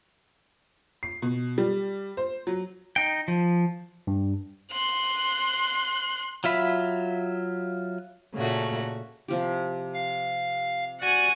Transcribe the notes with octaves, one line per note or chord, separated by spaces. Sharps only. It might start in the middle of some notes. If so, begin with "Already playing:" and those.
C7
B2
G3
C5
F#3
D#4 G5
F3
G2
C6 F#6
F#3 F4 E5 B5
A#2 C#3 A3 F#4
C3 F3 G4
F5
F#4 D5 F#5 G#5